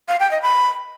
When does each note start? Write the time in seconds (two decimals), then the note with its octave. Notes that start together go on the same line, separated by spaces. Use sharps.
0.08 F5
0.20 G5
0.31 D#5
0.42 B5